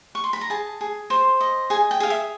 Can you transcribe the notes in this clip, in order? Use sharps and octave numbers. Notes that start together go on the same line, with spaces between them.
C#6
C6
B5
A#5
G#4 A5
G#4
C5
D#5
G#4 G#5
G5
G#4 F5
E5